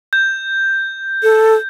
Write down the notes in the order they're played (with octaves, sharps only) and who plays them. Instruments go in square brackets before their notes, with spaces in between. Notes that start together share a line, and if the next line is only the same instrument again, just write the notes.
[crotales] G6
[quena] A4